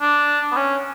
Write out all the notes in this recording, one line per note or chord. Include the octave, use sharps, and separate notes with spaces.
D4
B3
C#4